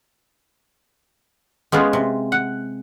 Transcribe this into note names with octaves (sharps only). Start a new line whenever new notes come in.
G#3 B3 C#4 F4
C3
F#5